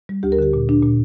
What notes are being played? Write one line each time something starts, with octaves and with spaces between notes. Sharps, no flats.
G3
D2 G4
A#4
D3 G4
A#2
D4
A#2